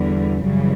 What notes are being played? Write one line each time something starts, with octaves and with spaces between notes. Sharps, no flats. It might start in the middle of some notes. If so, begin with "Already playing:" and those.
Already playing: E2 D3 G3
F#2 C#3 E3 G3